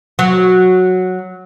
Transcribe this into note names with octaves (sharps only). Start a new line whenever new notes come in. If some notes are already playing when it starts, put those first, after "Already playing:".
F#3